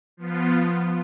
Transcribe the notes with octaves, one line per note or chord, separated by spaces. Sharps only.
F3 B3 F4